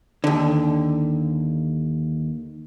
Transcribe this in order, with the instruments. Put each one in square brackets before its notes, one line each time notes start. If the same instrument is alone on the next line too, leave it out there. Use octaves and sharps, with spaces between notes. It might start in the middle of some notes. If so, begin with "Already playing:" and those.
[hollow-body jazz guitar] D#2 D3